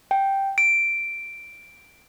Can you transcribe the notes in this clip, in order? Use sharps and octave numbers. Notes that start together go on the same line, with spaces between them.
G5
D7